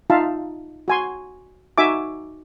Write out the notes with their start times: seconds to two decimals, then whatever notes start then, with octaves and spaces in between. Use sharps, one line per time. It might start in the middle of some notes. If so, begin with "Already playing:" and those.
0.10 D#4 F4 E5 F5 A5
0.88 F#4 G#5 C6
1.78 D#4 F#4 E5 G#5 D6